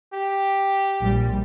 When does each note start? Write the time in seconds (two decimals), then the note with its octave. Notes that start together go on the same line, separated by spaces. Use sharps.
0.13 G4
1.01 A#1 G3